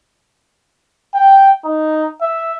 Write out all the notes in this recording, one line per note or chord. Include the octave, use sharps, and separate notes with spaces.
G5
D#4
E5